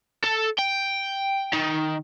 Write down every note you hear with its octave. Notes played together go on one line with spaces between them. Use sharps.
A4
G5
D#3